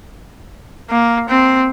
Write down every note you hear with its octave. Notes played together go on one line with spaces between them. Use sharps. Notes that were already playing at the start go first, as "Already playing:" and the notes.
A#3
C4